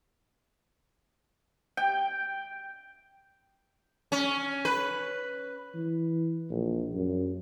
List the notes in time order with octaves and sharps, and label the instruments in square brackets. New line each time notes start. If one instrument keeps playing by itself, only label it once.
[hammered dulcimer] G5
[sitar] C#4
B4
[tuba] E3
A#1
F#2